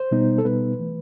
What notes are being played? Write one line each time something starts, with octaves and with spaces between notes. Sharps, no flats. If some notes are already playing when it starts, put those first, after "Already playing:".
Already playing: C5
B2 G3 B3 D#4
A4
B2 G3 B3 D#4 B4
E3 A3